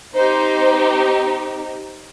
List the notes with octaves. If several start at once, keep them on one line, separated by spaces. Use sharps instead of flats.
C4 D#4 G4 C5